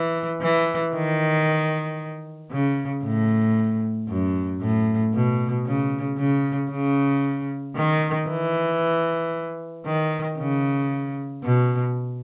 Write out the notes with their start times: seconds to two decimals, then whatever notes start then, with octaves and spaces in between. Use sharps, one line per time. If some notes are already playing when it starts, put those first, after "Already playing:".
Already playing: E3
0.42 E3
0.94 D#3
2.51 C#3
3.04 A2
4.09 F#2
4.61 A2
5.14 B2
5.66 C#3
6.18 C#3
6.71 C#3
7.76 D#3
8.28 E3
9.85 D#3
10.38 C#3
11.43 B2